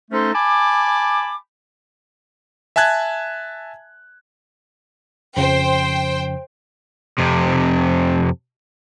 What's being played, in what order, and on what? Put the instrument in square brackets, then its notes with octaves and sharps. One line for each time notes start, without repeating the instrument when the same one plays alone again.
[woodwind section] A3 C#4 D#4 A4 C5
G#5 A5 B5 D6
[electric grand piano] E5 G#5 A5 F#6 G#6
[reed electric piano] F2 C#3 F3 [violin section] C5 G5
[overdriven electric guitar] F2 C3